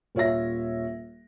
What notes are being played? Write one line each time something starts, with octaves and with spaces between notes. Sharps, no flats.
D#1 F4 C#5 E5 A#6